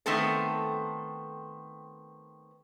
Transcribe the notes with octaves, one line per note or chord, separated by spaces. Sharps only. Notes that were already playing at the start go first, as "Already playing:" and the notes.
D#3 A3 B3 C4 A4 C5